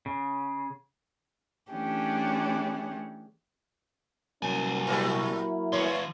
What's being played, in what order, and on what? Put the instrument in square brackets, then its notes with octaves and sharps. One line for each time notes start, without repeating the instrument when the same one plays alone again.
[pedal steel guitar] C#3
[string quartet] E3 A3 C#4 D4 G4 G#4
[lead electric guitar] C2 G#5 [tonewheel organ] F#3 A#3 [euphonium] C#4
[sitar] A#2 G3 A3 [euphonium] E4
[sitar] E2 C#5 [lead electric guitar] E3 C6